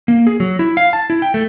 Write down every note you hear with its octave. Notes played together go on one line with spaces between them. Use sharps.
A#3
G#4
F#3
E4
F5
A5
E4
G5
A3